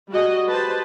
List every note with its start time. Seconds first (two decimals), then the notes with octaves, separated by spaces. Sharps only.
0.10 G3 F#4 G#4 D#5
0.50 G4 B4 C5 A5